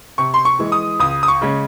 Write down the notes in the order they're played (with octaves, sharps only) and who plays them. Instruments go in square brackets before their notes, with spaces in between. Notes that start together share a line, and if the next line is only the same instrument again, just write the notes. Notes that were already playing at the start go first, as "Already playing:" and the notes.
[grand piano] C3 C#6
C6
C#6
E3 G#3
D#6
C#2 D#6
D#6
C#6
C#3 G#3 C#4